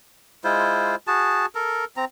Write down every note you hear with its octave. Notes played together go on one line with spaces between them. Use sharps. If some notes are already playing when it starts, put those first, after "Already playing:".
G#3 E4 F4 C5
F#4 G#4 A5
A4 A#4
C4 A#5